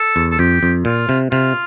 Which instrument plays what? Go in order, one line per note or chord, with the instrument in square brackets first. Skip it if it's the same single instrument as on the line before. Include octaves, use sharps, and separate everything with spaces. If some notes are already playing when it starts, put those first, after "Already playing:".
Already playing: [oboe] A4
[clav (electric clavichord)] E2
[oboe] A4
[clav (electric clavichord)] F2 [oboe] G4
[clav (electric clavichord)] F2
[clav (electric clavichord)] A#2 [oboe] F4
[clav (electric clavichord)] C3
[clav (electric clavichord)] C3 [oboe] F4